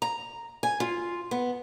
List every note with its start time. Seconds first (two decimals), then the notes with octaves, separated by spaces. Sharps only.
0.02 A#5
0.63 G#5
0.80 F4
1.31 B3